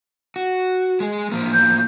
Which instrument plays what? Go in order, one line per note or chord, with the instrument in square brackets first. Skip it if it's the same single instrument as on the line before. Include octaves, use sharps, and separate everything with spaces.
[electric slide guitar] F#4
G#3 G#4
A2 F3 A#3
[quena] G6